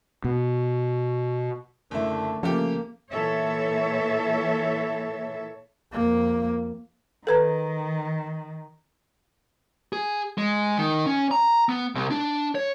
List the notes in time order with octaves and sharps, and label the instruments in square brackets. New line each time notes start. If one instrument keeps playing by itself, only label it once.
[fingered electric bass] B2
[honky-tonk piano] F#1 E4 [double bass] D3 A3
[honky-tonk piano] C#3 A3 G4 [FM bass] F3 [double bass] A#3
[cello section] A#2 E3 A4 C#5 E5
[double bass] F2 A#3
[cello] D#3 [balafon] A4 B4 A#5
[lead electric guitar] G#4
G#3
D#3
C#4
A#5
B3
C2
D4
C#5